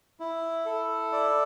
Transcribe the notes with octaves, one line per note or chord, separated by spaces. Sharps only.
E4
A4
D5